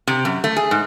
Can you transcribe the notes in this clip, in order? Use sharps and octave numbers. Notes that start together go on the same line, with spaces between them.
C3
F#2
A3
G#4
G#2